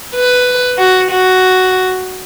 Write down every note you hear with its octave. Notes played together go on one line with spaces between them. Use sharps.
B4
F#4
F#4